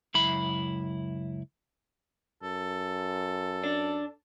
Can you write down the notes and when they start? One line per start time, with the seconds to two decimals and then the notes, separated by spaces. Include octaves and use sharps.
0.14 C#2 F#2 E4 B5
2.43 F#2 A4
3.64 D4